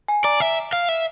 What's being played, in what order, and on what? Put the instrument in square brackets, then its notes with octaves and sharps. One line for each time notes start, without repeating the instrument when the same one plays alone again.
[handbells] G#5
[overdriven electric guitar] D5 [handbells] A#5
[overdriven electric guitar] E5
F5
E5